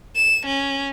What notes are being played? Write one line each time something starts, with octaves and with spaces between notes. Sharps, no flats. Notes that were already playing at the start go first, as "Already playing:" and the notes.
E7
C#4